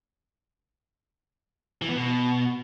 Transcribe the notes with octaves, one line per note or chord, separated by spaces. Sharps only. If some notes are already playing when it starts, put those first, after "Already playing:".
E3
B3
B2